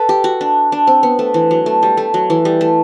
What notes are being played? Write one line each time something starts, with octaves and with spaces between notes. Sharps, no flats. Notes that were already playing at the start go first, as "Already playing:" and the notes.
Already playing: A4 B4
G4
F#4
D4
D4
C4
B3
A3
E3
F#3
A3
G3
A3
F#3
E3
G3
A3